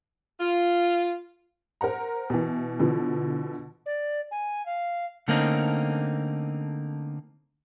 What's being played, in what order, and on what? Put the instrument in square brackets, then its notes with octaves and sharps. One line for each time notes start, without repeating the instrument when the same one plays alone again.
[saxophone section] F4
[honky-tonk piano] A#4 C5 F#5 A#5
B2 E3
B2 D3 E3 F3
[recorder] D5
G#5
F5
[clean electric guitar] D3 A3 A#3 C4 C#4 D#4